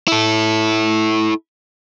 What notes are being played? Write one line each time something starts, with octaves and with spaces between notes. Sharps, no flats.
E4 A4